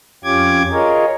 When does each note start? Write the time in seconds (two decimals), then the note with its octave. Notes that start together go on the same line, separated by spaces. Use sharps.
0.24 F2 C#4 F4 G4 D6 G#6
0.71 F4 G#4 A#4 C#5 D#5